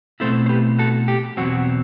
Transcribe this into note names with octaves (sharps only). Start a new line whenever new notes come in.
B2 A3 C4 E4 A4 C5
C5
G4 B4
F#4 A4
G4
E2 B2 F#3 C4 F#4